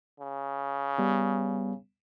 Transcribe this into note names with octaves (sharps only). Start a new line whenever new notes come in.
C#3
G3 B3